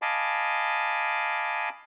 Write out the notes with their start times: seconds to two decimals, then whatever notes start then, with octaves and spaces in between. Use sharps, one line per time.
0.02 D#5 F5 G#5 A5 B5 D6